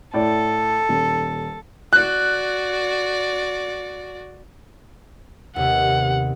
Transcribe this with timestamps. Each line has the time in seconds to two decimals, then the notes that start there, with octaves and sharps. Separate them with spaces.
0.14 A2 A4 D5
0.89 D#1
1.93 F#4 D5 F#6
5.56 D#2 C3 B3 F#5